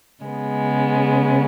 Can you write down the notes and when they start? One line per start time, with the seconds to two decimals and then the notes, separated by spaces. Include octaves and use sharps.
0.24 C#3 G#3 B3